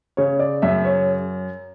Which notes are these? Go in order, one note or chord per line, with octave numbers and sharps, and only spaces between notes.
C#3 C#5
D5
F#2 E5
C#5